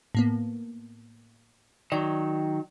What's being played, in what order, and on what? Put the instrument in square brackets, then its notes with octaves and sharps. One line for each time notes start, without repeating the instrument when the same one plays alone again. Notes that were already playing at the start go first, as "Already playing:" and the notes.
[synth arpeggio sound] A2 A#3 B3
[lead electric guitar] D#3 F#3 [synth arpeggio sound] D5